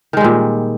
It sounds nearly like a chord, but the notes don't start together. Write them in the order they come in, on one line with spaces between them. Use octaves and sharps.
D#3 G#3 G3 A#2